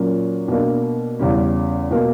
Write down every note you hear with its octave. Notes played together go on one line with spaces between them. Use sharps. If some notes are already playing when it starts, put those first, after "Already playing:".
Already playing: A#2 F#3 A#3 C#4 F#4
B2 A#3 D4
E2 C#3 G3 C#4
B2 A#3